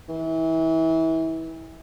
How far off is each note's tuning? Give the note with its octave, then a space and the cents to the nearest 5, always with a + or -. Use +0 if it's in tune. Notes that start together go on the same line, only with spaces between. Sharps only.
E3 -30